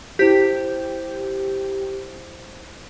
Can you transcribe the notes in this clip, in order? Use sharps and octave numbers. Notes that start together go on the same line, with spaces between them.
E4 G4 C5 B6